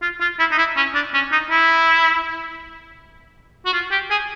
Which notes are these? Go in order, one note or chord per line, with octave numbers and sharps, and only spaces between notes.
F4
F4
E4
D#4
E4
C#4
D4
C#4
D#4
E4
F#4
F4
G4
G#4